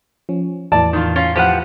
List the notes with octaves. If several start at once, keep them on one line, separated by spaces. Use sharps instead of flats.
F3 C#4
E2 A2 E3 D5 A5
D#3 F4
C#4 F4
F3 G4 B4 F#5